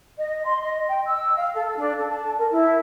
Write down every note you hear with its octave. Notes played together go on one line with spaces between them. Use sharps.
D#5
C6
D#5
G5
E6
F5
A4
D4
A4
A5
A#4
E4